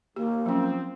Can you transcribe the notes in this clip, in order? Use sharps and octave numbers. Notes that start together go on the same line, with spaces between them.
D#2 A#3 G4
F3 F#3 C4 C#4